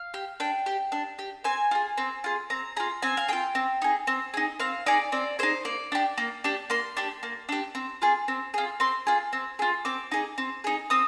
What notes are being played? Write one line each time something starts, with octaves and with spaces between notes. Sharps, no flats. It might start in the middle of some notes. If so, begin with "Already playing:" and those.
Already playing: F5
G4
D4 G5
G4
D4
G4
C4 G#5
F4 G#4
C4
F4 G#4
C4 A#5
F4 G#4 A#5
C4 G#5
F5
F4 G#4 G5
C4
D#4 G#4
C4
D#4 G#4
C4 F5
D#4 G#4 D5
C4 D5
D#4 G#4 C5
A#3 D5
D4 G4
A#3
D4 G4
A#3 C6
D4 G4
A#3
D4 G4
C4
F4 G#4
C4
F4 G#4
C4 C6
F4 G#4
C4
F4 G#4
C4 D6
D#4 G#4
C4
D#4 G#4
C4 D#6